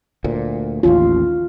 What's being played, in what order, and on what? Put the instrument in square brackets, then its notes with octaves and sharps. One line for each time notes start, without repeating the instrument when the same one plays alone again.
[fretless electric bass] D2 A#2
[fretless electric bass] A1 D#2 C#4 [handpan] F4